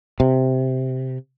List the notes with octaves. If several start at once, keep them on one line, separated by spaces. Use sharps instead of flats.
C3